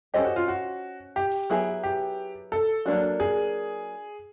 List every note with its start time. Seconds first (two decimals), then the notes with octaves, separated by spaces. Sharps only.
0.14 C#4 E4 G4 A4 C5 D#5
0.25 F#4
0.36 F4
0.48 F#4
1.16 G4
1.50 F#3 B3 E4 G#4
1.83 G4
2.52 A4
2.86 F#3 A#3 D4 F#4
3.20 G#4